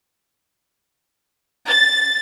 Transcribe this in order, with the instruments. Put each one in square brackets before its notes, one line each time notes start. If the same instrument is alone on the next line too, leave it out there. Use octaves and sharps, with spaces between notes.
[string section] A6